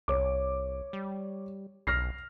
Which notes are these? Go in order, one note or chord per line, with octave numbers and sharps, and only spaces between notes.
C2 C#5 D6
G3
B1 F6 A#6 C7